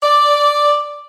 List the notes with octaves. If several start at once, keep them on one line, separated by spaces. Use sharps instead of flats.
D5